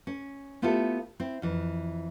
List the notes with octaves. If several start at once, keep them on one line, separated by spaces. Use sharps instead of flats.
C#4
A3 B3 E4 F4 G4 A4
C4 E4
F2 E3